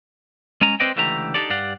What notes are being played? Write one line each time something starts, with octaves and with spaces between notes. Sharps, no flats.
G#3 C#4 G#5 A#5
C4 B4 C5 D5 D#5 G5
C#2 D3 E3 A3 G4 A#5
D4 D#4 F4 G4 A4 D5
G2 G4 D5 F5 F#5